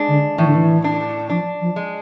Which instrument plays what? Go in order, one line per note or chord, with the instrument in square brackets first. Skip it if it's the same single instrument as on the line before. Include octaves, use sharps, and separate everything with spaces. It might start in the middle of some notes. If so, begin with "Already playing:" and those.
Already playing: [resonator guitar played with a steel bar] G#3 D4
[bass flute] D3
[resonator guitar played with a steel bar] A2 [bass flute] E3
[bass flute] D3
E3
[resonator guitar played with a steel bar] D4
[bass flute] F3 [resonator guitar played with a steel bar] D4
[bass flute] F3
[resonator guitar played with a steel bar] G#3